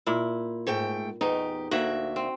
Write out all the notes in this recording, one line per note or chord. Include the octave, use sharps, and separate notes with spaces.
A#2 E4
G#2 A3 G5
E2 D#4 G4
D2 A#3 F#4 E5
C4